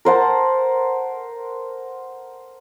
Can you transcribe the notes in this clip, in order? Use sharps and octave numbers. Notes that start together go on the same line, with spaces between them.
A#4 C5 F#5 A5